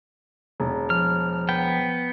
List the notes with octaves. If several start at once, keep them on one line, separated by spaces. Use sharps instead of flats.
E1
F3 F6
B3 G5